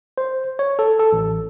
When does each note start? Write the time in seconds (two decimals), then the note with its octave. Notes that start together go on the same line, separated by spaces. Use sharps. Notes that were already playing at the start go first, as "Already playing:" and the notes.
0.18 C5
0.59 C#5
0.79 A4
0.99 A4
1.13 A1